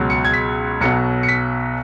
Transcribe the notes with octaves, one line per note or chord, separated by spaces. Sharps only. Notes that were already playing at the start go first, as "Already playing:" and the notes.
Already playing: C#2 B2 F#3
C#7
G#6
B6
B1 B2 F#3 C#7
C#7
B6